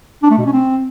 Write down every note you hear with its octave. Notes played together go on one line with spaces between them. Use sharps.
D4
A3
B2
C#4
C4